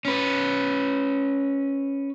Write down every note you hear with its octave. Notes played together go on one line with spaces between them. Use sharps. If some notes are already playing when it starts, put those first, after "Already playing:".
C#4 B4